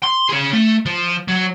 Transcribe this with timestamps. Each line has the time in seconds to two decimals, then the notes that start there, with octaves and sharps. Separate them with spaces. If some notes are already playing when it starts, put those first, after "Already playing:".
0.03 C6
0.29 C#4 G#4
0.53 A3
0.86 F3
1.28 F#3